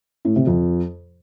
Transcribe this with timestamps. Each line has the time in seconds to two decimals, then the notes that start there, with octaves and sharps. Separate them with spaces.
0.25 A2
0.36 C3
0.47 F2